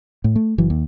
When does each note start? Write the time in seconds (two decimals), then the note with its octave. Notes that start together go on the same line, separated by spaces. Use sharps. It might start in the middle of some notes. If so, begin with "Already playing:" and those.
0.24 A2
0.36 A3
0.58 F#1 E3 F#3
0.70 D#2